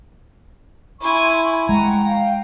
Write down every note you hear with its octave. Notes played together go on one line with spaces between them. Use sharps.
E4 G#5 C6 C#6
G#3 F#5 G5 A#5
F5 G5